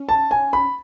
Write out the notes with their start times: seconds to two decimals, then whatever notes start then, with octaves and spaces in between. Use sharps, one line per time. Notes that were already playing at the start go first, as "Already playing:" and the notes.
Already playing: C#4
0.09 A5
0.31 G#5
0.53 B5